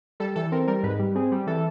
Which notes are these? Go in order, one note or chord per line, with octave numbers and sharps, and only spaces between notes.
G3 A4
E3 A4
C4 A#4
G3 A#4
G#2 B4
G3
C4 G#4
G3
E3 A4